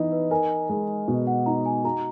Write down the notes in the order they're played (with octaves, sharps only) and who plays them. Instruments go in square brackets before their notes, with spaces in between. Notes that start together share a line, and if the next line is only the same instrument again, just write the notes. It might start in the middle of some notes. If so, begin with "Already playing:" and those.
Already playing: [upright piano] E3 B3 D#4
[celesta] B4
[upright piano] A#4 [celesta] G#5
[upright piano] G#3
B2
[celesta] F#5
[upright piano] D#4 [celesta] A#5
[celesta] G#5
[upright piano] F#4 [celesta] A#5